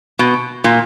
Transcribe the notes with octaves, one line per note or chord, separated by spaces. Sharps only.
B2
A#2